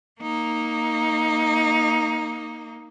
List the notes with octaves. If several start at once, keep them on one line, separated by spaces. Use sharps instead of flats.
A#3 D#4